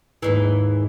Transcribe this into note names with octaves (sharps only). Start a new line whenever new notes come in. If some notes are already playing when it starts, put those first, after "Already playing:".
D#2 G#2 E3